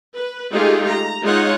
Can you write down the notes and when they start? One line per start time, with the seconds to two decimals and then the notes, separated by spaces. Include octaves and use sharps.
0.15 B4
0.52 G#3 A3 D#4 F4 G4 G#4
0.88 A#5
1.22 G#3 D#4 F4 C#5 F#5